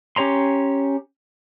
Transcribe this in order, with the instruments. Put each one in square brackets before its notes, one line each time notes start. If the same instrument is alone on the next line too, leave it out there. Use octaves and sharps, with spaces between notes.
[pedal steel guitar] C#4 G4 C#5 A#5 C6